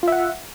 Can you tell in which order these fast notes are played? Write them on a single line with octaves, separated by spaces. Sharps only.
F4 E5 F#5